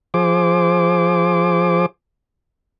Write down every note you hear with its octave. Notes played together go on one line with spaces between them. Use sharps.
F3 G#4 C5 D6